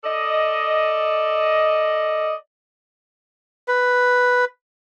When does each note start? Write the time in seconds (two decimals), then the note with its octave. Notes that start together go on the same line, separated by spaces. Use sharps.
0.04 A4 D5 D#5
3.68 B4